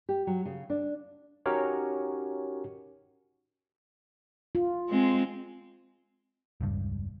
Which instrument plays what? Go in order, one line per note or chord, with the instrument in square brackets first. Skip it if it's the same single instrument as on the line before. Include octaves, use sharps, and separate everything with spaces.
[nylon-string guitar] G4
F#3
C#3
D4
[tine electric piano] C#4 D#4 F#4 G4 A#4 C#5
[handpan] F4
[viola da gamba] G#3 C4
[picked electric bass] E1 C#2 G2